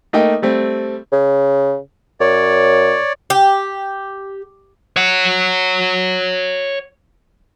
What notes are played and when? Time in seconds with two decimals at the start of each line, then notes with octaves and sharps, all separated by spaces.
0.13 A3 A#3 D#4 D#5 G5
0.42 G3 A3 C4
1.12 C#3
2.20 F#2 C#5 D5
3.30 G4
4.96 C#5 F#5